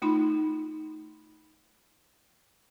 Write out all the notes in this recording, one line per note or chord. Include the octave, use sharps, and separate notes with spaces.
A3 D#4 F4 B5